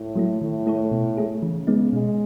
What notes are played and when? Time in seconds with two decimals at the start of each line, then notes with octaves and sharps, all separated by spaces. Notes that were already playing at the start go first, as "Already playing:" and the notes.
Already playing: A2
0.15 F#3 A3 E4
0.41 A2 D#3
0.67 A3 E4 A4 C#5
0.91 B2
1.17 A3 E4 G#4
1.42 C#3 E3
1.67 G#3 B3 D#4
1.93 B2 G#3